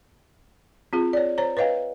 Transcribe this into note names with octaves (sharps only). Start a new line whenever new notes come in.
C4 F4 G#4
C#5 D5
C5 C#5 A#5
B4 C#5 D#5 F5 G5